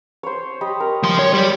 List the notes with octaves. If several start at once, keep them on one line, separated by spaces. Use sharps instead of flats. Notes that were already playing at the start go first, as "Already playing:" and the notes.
C5 C#5
G4 D#5 B5
A#4
F3 C6
C#5
G3 G4